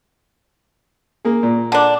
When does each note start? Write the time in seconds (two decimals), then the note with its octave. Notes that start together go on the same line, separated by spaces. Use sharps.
1.25 A#3 G#4
1.43 A#2
1.72 D3 D4